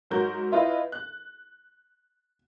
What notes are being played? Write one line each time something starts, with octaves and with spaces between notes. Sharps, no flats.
G#2 F#3 F#4 A#4 G6
E4 F4 B4 D#5
F#6